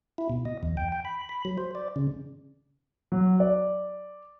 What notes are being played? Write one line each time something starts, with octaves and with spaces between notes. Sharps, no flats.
E4
B2
D#5
E2
G5
G5
B5
B5
F#3
C5
D5
C#3
F#3
D5